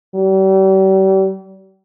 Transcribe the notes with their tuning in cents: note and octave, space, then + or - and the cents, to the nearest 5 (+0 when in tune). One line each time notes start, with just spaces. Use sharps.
G3 -40